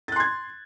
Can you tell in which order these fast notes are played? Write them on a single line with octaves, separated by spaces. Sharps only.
A6 F#6 C6 G#6